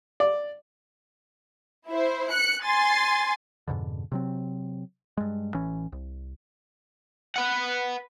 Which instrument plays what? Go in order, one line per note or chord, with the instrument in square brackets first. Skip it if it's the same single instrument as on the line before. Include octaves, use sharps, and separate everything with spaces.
[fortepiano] D5
[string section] E4 C5
F#6 C#7
G#5 C6 A6
[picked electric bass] F2 G#2 B2 D3
C3 F#3 C4
G2 G#3
A1 E3 C#4
C2
[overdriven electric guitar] B4 F#5